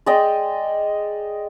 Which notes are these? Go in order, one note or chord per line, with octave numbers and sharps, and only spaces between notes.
G#3 D5 D#5 G5